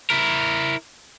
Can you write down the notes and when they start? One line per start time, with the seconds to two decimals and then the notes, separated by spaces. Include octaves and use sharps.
0.10 E4 A#4